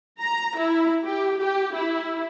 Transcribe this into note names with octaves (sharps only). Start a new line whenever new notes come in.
A#5
E4
G4
G4
E4